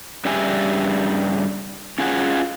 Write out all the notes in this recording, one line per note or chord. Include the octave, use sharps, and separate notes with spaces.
G2 C#3 D4 G4 E5 G#5
C#4 F4 G#4 F#5